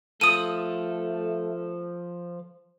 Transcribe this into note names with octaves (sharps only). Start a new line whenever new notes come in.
F3 A3 A4 D#6 D#7